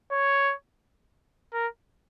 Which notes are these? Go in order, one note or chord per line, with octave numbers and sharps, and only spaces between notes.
C#5
A#4